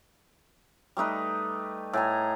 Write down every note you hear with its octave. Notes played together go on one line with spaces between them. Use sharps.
G3 A3 D#4 B4
A2 G#5 A#5